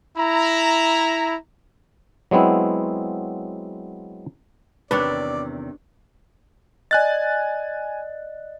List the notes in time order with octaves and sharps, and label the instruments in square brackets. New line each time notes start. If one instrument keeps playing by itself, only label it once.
[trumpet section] E4 A#5
[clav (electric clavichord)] F#3 G#3 B3 C4 E4
[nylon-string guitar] E2 C3 D#3 [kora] D4 C#5 [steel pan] B4 [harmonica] D5
[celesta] D5 D#5 [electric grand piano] G#5 F#6 A6